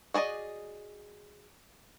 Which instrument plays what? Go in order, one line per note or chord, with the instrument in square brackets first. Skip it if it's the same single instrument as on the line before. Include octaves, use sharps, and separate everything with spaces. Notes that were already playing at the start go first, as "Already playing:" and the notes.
[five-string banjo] F#4 G#4 D5 D#5